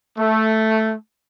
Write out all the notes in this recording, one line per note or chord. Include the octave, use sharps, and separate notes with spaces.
A3